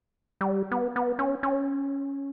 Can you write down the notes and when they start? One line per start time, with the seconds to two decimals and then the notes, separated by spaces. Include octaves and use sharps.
0.41 G3
0.71 B3
0.96 B3
1.19 C#4
1.43 C#4